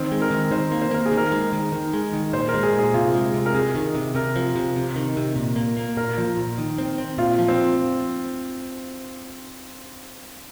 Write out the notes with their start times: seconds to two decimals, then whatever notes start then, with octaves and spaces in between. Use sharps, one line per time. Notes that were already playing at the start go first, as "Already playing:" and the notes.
Already playing: D#3 C4
0.12 G#3
0.21 A#4
0.31 D#3
0.51 D#3 C5
0.72 A#3
0.82 C5
0.91 A#3 A#4
1.06 G#4
1.12 D#3
1.17 A#4
1.32 G#3
1.53 D#3
1.72 D#3
1.93 G#3
2.13 D#3
2.33 A#2 C5
2.49 A#4
2.54 G#3
2.63 G#4
2.74 A#2
2.79 G#4
2.94 C3 F4
3.14 G#3
3.34 C3
3.46 A#4
3.54 C3 G#4
3.75 D#3
3.95 C3
4.15 C3 A#4
4.36 F3
4.56 C3
4.76 C3
4.96 D#3
5.17 C3
5.36 A#2
5.56 A#3
5.77 A#3
5.97 A#2 A#4
6.18 F3
6.37 A#2
6.58 D#3
6.78 C4
6.98 C4
7.18 A#2 F4
7.39 F3
7.48 C4